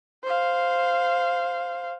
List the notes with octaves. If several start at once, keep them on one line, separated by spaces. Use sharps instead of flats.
C5 F5